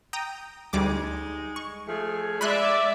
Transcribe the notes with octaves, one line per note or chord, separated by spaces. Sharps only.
G5 A#5 D#6
D2 G3 G#3 D#4 D6
C#6
F3 A3 G#4
G#3 D5 E5 B5 C6 F#6